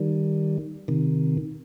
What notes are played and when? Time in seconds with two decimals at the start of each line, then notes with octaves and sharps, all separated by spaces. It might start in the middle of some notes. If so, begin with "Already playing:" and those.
Already playing: D#3 G3
0.88 C3 D#3